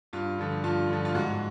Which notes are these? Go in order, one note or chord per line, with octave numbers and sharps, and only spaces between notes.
G2 F4
D3 F3
G2 F4
D3 F3
F4
G#2 F#4